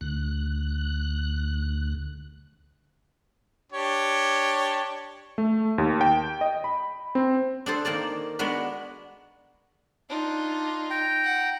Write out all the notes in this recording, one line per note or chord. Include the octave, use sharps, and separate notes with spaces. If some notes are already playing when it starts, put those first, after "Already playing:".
D2 F#6
D4 G4 C#5
A3
D#2
G5
D#5
B5
C4
D4 G#4 A4 C5
D#3 A#3 D5 A5
G#3 B3 D4 F#4 B4
D4 D#4 F4
G5 A#5
F#5